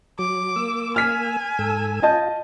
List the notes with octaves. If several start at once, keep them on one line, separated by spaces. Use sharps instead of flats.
F#3 D6
A#3 E6
G#5 F6 B6
G#2 A4 E6
F4 D#5 A5 G6